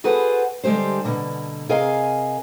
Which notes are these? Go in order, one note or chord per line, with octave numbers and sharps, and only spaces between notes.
F#4 G#4 A4 B4 C5 F#5
D3 G3 G#3 G4 C5
B2 D3 A#3
C3 G#4 A#4 D#5 F5 G#5